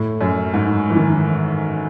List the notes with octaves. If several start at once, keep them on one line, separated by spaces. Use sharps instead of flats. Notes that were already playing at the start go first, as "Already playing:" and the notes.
Already playing: A2
F#2
G#2
E3
D#3